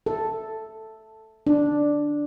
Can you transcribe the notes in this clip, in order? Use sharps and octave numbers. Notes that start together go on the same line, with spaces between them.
A4
D4